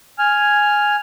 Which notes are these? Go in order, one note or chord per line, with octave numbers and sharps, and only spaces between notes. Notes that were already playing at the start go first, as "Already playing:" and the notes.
G#5 F6